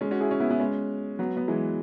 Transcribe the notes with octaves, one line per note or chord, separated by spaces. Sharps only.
G#3 C#4
C#4 F#4
E4 G#4
C#4 F#4
B3 E4
B3 E4
G#3 C#4
F#3 B3
B3
E3 G#3